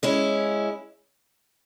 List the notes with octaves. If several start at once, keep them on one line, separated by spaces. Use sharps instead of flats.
G#3 C#4 E4